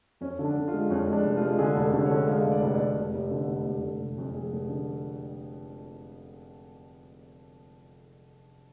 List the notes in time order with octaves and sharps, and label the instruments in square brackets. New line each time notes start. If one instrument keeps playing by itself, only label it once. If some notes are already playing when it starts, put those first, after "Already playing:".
[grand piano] F2 C#4
D3
D4
D3
F4
G#3
F2 C#4
G#3
D4
F1
F4
G#3
D3 G#4
F1
A4
D3
D3 C#5
G#3 F5
F1
D5
F1
F1 D5
F1
F1
D3
F1
F1
F1
F1
F2
F1 G#4
F1
D3